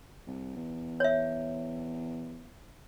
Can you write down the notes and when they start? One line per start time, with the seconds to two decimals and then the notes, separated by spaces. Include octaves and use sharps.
0.27 C2
0.56 E2
1.00 C#5 E5